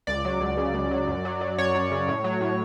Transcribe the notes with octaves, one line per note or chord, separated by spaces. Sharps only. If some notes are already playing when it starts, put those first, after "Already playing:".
C#2 D5
F#3
C#2
C#3
C#2
F#3
F#2
F#3
F#3
F#2 C#5
F#2
C#3
A2
F#3
A2